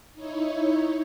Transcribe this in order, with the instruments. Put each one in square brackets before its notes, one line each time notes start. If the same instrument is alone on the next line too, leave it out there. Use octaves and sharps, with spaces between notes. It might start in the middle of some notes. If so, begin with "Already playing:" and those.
[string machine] D#4 E4 C#5